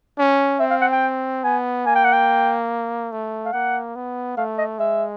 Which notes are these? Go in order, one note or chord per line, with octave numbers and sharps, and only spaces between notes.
C#4
C4 E5
F5
F#5
G5
B3 G#5
A#3 G#5
G5
F#5
G5
A3
F5
A#3 F#5
B3
A3 F5
D#5
G#3 E5